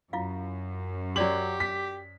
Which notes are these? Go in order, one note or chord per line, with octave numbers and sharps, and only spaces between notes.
F#2 E4 F4 F5
F#3 F#4 G4 D5 F#7
B6